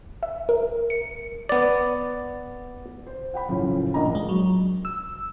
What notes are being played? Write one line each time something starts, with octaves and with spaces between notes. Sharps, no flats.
E5
A#4
C#7
B3 D5
C5
F#5 G5 B5
F#2 A2 C#3 F3
A#1 A#3 D4 D#5 A#5
G#3
F#3
E6